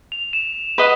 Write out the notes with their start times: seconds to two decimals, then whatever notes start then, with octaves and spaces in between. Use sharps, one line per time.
0.12 F7
0.33 E7
0.78 B4 D#5 F#5 B5